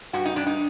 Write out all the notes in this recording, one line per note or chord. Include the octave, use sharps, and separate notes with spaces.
G2 F#4
D#4
G2 D4
D#4